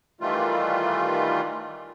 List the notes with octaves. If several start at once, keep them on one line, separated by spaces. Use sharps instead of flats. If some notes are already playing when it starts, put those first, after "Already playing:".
D#3 E3 G3 A3 F4